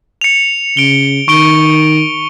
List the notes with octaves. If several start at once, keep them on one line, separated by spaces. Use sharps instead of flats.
C#7 F7
C#3 D7 G7
D#3 C#6 D7 G7